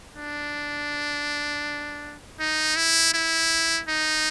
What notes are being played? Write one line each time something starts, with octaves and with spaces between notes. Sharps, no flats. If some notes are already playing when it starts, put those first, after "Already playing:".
D4
D#4
E4
E4
D#4